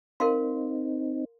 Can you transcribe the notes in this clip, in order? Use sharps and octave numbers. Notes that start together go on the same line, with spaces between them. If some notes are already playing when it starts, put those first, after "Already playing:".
C4 D#4 A#4 F5 C6